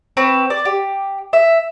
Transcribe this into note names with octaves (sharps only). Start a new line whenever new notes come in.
C4 B4 C#6
D5
G4
E5